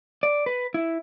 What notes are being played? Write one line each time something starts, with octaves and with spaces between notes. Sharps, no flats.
D5
B4
E4